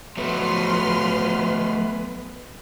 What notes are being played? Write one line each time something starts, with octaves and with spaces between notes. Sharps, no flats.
F3 F#3 A3 B3 B4 C6 F6